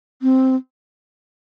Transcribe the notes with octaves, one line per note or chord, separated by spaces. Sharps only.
C4